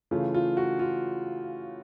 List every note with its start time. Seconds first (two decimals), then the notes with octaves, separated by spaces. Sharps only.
0.11 C#3 E3 A3 F4
0.34 F4
0.57 F#4
0.79 F4